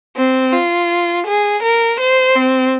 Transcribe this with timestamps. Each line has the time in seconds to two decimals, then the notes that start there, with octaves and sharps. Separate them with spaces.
0.17 C4
0.53 F4
1.27 G#4
1.63 A#4
2.00 C5
2.36 C4